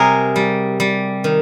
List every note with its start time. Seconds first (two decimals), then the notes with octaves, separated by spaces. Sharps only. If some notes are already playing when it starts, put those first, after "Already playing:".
Already playing: C3 G3 G#4 A#4
0.36 G3
0.80 G3
1.24 D#3